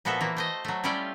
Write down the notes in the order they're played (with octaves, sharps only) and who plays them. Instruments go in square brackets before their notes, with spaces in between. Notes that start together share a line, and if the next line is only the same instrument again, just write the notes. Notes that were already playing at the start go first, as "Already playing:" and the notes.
[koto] A#2 F3 B3 F#4 A4 E5
E3 A#3
A3 C5 D#5
F#3 A3
G3 C#4 E4 F4 G4 D5